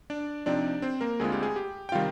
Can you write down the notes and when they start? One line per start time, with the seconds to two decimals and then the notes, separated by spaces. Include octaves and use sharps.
0.10 D4 D5
0.46 C3 F3 C4 D4 D#4 D5
0.82 C4 C5
1.01 A#3 A#4
1.20 D2 D3 G#3 C4 F4 G#4
1.32 G4
1.43 G#4
1.56 G4
1.89 G5
1.92 C3 D#3 G3 F4 F5